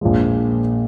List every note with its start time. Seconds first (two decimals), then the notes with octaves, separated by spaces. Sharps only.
0.01 A#1 A#2 F3 G#3